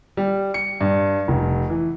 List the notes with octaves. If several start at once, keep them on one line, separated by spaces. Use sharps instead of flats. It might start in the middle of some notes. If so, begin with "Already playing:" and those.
G3
C#7
G2
F1
E3